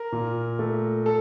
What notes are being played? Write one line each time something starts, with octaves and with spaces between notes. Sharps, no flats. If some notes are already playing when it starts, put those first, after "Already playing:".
Already playing: A#4
A#2
A3
A4